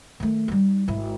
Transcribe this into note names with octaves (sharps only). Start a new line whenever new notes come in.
D#3 A3
G3 D#4
G#1 E4